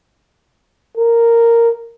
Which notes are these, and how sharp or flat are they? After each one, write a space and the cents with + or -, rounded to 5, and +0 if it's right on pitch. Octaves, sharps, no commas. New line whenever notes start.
A#4 -5